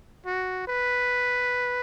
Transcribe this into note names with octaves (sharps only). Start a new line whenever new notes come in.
F#4
B4